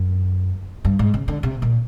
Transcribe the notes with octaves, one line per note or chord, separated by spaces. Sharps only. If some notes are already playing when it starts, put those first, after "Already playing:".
Already playing: F#2
G2
G#2
C#3
D3
C3
A#2